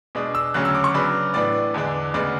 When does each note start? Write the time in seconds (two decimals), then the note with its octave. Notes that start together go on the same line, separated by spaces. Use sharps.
0.15 B2 G#3 D4
0.35 E6
0.54 D2 C#3 F#3 C#4 F#6
0.65 E6
0.75 D6
0.84 C#6
0.94 C#3 F#3 B3 D4 B5
1.34 A2 E3 B3 D4 D5
1.74 E2 D3 G#3 D4
2.14 D2 C#3 G#3 B3 D4 D5